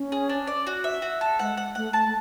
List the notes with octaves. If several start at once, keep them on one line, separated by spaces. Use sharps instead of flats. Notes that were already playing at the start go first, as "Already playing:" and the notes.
Already playing: C#4
G#4
D4
D5
F#4
E5
F#4
A4
G#3 F#5
F#5
A3 F#5
A5
A3